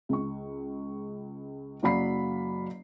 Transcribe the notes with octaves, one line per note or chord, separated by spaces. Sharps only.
C#2 C#6
F#1 F#3 D5 F5 B5 C7